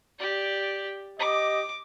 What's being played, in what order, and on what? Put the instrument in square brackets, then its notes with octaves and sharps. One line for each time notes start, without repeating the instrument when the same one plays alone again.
[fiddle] G4 D5
[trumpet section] G4 D#5 [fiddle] D6